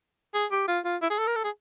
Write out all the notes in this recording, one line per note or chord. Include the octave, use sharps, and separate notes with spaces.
G#4
G4
F4
F4
E4
G#4
A4
A#4
A4
G#4